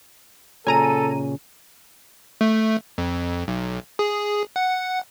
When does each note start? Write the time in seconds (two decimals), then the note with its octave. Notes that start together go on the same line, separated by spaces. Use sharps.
0.67 A#2 C#3 C#4 A4 G#5 A#5 D#7
2.41 A3
2.98 F2
3.48 B1
3.99 G#4
4.56 F#5